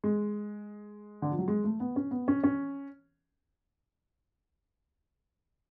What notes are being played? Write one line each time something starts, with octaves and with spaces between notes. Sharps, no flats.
G#3
D3
F3
F#3
G#3
A3
B3
C#4
B3
C#4
C#4